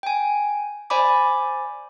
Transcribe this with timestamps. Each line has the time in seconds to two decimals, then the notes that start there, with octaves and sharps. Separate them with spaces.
0.03 G5 G#5
0.90 C5 D5 G#5 B5 D6